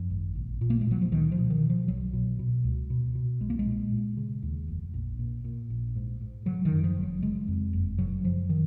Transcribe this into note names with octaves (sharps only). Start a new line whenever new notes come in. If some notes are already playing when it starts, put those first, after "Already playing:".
Already playing: F#2 F3
G#1
A#1
A#2
A#3
G#3
A#2 F#3
F3
C#2 D#3
F3
B2
D#3
B2
F3
B1 F#3
B2
B2
C#2
B2
B2
B1 G#3
A#3
G#3
A#2
A#2
C#3
D#2
F1
A#1
A#2
A#2
A#1
G#2
G#2
C#3 F#3
D#3
F#2
F3
F#1
F#3
C#3 G#3
F2
F#1
C#3 F#3
F#2 F3
D#3